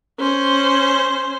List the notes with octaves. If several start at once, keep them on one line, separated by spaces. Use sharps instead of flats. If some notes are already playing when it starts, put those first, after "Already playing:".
C#4 C5